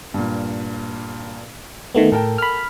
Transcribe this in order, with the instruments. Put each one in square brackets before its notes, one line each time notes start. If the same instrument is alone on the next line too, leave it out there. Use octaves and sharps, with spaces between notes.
[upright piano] G2 A#2
[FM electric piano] D#3 A3 B3
[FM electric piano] A2 [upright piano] A4 A#4 G5
[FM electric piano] B5 F6